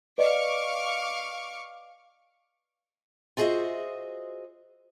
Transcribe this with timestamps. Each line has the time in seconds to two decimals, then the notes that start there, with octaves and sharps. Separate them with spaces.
0.18 B4 D5 D#5 F5 C#6 D6
3.37 F4 F#4 G#4 C5 D#5 E5